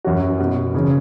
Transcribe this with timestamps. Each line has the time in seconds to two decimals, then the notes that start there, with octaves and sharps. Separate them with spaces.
0.05 F#2 E3 C#4 F#4
0.40 B2 B3 F#4
0.74 C#3 E3 C#4 G#4